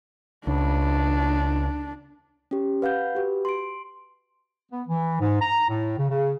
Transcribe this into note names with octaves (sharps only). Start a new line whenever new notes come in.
C#2 D4
C#4 G4
B4 F5 F#5 G6
F#4 G4 B4
C6 D7
B3
E3
G#2
A#5
A2
C#3
C#3